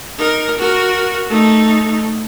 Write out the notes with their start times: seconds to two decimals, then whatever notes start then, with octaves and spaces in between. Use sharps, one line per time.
0.18 D#4 A#4
0.58 F#4 A#4
1.30 A3 D#4